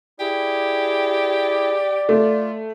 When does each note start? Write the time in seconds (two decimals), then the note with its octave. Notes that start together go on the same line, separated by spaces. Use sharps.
0.20 E4 G4 G#4 D5
2.09 A3 F4